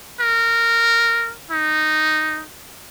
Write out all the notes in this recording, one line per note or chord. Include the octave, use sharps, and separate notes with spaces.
A#4
D#4